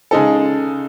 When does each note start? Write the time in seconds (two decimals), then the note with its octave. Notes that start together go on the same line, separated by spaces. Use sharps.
0.11 C#3 G#3 D#4 A4